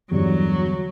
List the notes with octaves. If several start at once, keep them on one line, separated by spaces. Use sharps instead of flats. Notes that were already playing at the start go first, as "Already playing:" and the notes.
E2 G2 D3 F#3